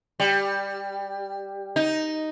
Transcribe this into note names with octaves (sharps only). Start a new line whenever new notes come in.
G3
D#4